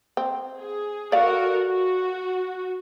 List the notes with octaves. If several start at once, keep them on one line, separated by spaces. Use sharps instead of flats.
C4
G#4
F#4 A4 A#4 D5 F5
F#4